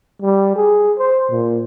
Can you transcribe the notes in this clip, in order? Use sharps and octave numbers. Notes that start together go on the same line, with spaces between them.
G3
G#4
C5
A#2